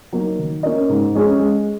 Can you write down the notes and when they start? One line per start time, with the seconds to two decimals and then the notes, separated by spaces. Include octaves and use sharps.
0.12 F#3 A#3 D#4
0.39 D#3
0.63 A#3 C#4 A#4 D#5
0.89 G#2
1.15 G#3 C#4 G#4
1.39 G#3